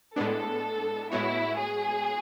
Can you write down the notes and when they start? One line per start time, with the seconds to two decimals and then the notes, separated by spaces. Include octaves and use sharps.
0.16 A2 G#3 B3 D4 A4
1.11 A2 G#3 B3 E4 F#4 C#5
1.58 G#4